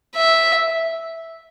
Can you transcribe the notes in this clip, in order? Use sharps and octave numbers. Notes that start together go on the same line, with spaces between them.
E5